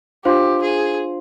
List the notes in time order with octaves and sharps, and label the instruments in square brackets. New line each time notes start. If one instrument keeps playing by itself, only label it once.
[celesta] D4 F4 C5 F5 C6 [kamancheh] G4
[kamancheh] G#4